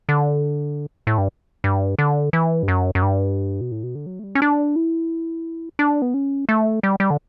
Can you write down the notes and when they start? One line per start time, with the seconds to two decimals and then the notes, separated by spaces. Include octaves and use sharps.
0.09 D3
1.07 A2
1.18 G2
1.64 G2
1.99 D3
2.33 E3
2.63 G2
2.68 F#2
2.95 F#2
3.02 G2
3.61 B2
3.71 A2
3.83 B2
3.95 D3
4.06 F#3
4.19 A3
4.24 G3
4.35 C#4
4.42 D4
4.76 E4
5.79 D4
6.02 B3
6.14 C#4
6.49 A3
6.83 G3
7.00 G3
7.10 D3